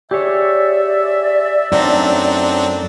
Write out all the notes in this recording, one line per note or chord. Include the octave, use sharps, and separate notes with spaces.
G4 G#4 C#5 D5 E5
F#2 F#3 A3 C4 D4 D#4